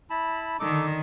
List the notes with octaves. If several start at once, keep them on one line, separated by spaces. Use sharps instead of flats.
E4 A5 B5
D3 D#3 D#4 A4 D6